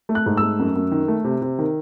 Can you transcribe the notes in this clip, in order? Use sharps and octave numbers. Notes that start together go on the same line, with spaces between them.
A3
F#6
G#2
A3 E6
F#2
F#2
D#3
A3
C3
C3
D#3